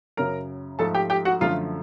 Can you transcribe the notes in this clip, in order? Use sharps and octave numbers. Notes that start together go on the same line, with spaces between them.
F#2 C#3 F#3 A#4 A#5
G#2 F3 A3 A4 A5
G4 G5
G4 G5
F#4 F#5
F#2 D3 F3 A3 F4 F5